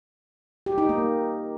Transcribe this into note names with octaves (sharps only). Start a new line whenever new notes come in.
G4
D#4
A#3